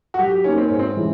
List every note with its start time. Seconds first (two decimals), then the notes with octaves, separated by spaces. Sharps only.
0.14 F#4
0.19 F#3 G4
0.31 G4
0.44 A#3 C#4 D#4
0.58 C4
0.68 G#2 C#4
0.79 C4
0.97 E3 G#3 C#4 E4